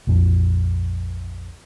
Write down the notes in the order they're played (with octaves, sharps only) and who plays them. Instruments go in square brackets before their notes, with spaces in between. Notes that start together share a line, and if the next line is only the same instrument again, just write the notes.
[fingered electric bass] A#1 F2 F3